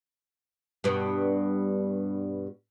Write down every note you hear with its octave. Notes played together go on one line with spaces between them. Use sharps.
G2 B2